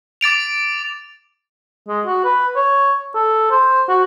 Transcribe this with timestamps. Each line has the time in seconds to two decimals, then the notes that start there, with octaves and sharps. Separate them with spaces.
0.21 D6 A6 D7 F7
1.88 G#3
2.06 F#4
2.24 B4
2.56 C#5
3.15 A4
3.51 C5
3.89 F#4